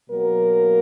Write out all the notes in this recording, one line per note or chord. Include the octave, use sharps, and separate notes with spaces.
B2 F#3 A#3 A#4